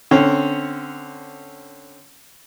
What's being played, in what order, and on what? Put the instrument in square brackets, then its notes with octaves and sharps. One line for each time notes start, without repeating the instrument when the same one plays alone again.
[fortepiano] D3 C4 C#4